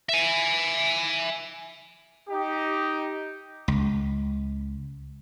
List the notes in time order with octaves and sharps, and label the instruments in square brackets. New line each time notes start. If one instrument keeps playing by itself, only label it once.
[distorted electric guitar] E5 G#5
[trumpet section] D#4 G4
[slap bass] C#2